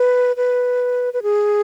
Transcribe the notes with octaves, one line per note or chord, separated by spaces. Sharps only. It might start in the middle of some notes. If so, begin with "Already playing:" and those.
Already playing: B4
B4
B4
G#4